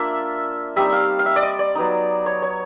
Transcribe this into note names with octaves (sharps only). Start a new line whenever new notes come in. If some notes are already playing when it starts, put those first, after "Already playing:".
Already playing: A#3 D4 F4 E5
G3 C4 D#4 E5
F5
F5
E5
D5
D#5
D5
F#3 B3 D#4
C#5
C#5